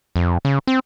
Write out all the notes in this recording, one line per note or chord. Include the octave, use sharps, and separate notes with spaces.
F2
C#3
C4